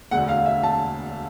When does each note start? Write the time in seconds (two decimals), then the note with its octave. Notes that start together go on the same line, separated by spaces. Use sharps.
0.11 E1 D2 D3 F#5
0.29 F5
0.46 E5
0.63 A5